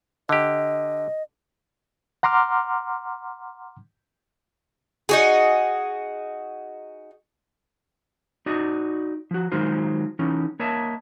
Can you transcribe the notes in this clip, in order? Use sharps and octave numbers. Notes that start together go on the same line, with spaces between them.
D3 G4 D#5
F#5 A#5 C6 D6 F6
D#4 F#4 G#4
D#4 F#4 D5 D#5
F3 F#4
D#3 F#3 G#3 D#4 F4 C5
E3 C#4 D#4
A#3 C#5 D#5 E5 A5